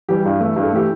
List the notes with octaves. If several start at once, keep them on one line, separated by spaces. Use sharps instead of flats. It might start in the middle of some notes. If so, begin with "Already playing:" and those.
E3 G3 G4
G2
E3 A3
G2
A4
E3 A3 G4